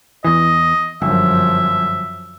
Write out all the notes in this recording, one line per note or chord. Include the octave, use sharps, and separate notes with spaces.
E2 E3 D#5
G1 F#2 F3 E5